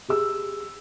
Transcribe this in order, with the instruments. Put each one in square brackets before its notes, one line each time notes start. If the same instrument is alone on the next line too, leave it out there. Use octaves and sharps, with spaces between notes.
[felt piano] G4 G#4 E6